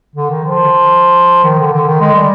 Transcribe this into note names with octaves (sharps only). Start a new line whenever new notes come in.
D3
D#3
F3
D#3
D3
D3
D#3
G#3
G3